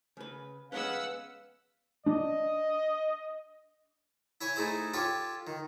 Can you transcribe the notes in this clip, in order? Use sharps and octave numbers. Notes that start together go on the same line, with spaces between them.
C#3 B4
G#3 B3 C#4 B4 F5 F#5 E6
D4 D#5
E4 C#5 G#5
A3 D#4 E4 G#4 C5
F4 G4 A4 C#5
D#3